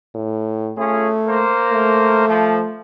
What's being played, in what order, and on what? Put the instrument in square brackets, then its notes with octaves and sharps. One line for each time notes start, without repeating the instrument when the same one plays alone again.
[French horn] A2
[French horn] A3 [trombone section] C#4 F4 G#4
[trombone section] A#3 A#4 C5
[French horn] A3
[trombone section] F3